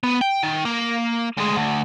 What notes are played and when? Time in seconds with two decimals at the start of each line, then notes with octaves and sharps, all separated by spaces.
0.04 B3
0.21 G5
0.43 D#3
0.65 A#3
1.37 D2 G#3
1.55 D2